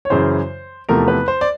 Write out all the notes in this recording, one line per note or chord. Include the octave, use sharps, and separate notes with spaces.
C#5
F#2 C#3 E3 C5
E2 C3 F3 A3 A#4
B4
C5
D5